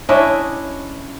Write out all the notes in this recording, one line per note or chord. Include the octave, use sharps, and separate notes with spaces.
C#4 D4 E4 D#5